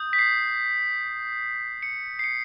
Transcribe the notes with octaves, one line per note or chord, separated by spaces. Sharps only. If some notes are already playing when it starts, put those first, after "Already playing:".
Already playing: D#6 G6
B6
C7
C#7
C7
C#7